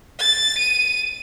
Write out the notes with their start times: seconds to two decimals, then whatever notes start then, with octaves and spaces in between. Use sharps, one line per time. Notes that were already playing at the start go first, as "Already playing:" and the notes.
0.19 A6
0.59 D#7